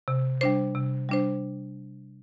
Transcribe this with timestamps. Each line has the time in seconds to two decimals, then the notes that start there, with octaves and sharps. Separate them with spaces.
0.08 C3
0.41 G3 D4 C5
0.75 C3
1.09 G3 D4 C5